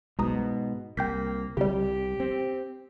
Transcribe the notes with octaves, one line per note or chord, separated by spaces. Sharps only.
C2 G#2 B2 A#5 D#6
C2 A#3 G5 G6 B6
C2 C#3 G3 G4
C4